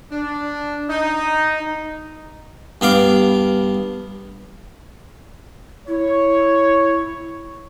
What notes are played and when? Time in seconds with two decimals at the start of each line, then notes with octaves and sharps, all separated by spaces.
0.11 D4
0.89 D#4
2.81 G2 B3 F5 D6
5.88 E4 C#5